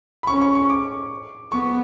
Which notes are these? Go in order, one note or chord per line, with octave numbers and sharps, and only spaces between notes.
B5
C#4 C#6
C#6
C#6
D6
B3 C#6